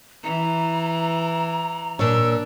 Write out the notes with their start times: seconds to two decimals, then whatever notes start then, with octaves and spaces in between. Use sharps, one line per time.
0.23 E3 A#5
1.99 A#2 D4 C#5 E6